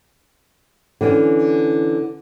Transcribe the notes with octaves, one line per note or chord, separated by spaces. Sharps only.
D3 E3 C#4